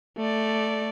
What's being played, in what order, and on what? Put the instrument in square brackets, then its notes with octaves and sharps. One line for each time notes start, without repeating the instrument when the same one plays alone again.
[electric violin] A3 D5